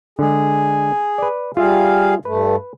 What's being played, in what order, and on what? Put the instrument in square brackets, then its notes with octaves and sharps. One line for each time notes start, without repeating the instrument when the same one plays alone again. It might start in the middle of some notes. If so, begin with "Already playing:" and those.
[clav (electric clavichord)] D3 G#3 [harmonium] G#4
[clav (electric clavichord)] B4 D5
[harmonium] G3 G#4 F5 [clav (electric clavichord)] F4 E5
[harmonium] G2 A3 [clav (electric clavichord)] B4